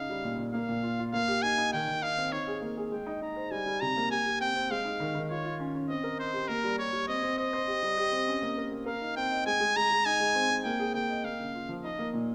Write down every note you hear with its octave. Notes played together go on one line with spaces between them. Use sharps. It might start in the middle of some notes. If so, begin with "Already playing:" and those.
Already playing: C#3 D#4 F5
G3
A#2
A#2
A#3 F5
A#2
F4
F4
A#3 F5
G4
D#4 G#5
D#4
D#3 G5
D#3
D#4 F5
C4
D#4 C#5
G#4
A#3
G#4
G#3 G5
D#4
D#4 A#5
C5
G3 G#5
G3
C3 A#5
A#3
G4 G#5
G4
C4 G5
C4
G#3 F5
D#4
D#3
D#3
F4 C#5
F4
C#4
C#4
C4 D#5
A#4
C5 D#5
G4
A#3 A#4
G3
G4 C#5
G3
C4 D#5
C4
C5 D#5
C5
G4
G3
G4
C4
C#4
A#3
A#4
A#3
A#4 F5
D#4
C4 G5
D#5
G#3 G#5
G#3
G#3 A#5
G#3
D#4 G#5
G#3
C4
C4
A#3 G5
G#4
A#3 G5
D#5
A#3 F5
C#3
F4
F3
D#4 D#5
A#3
A#2